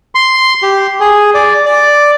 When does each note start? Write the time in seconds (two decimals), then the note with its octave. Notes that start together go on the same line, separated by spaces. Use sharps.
0.15 C6
0.63 G4
1.00 G#4
1.34 D5
1.65 D5